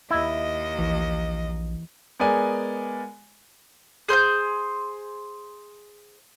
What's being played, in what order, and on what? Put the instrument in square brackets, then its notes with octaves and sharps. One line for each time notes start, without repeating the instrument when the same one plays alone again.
[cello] D#2 D#5 [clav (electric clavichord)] E4
[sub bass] A#1 [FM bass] E3
[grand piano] G#3 B3 A#4 D5 G#5
[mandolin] G#4 C5 C6 G6